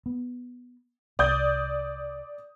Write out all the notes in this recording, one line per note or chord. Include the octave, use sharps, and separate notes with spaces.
B3
C2 D5 D#6 G6